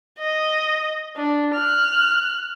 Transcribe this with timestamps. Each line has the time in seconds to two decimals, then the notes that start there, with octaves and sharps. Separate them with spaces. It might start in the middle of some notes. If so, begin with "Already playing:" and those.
0.19 D#5
1.16 D4
1.55 F6 F#6